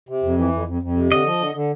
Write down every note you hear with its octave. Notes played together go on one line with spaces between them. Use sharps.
C3
F2
E3
F2
F2
F2
C3
D3 D#5
F3
D3
D3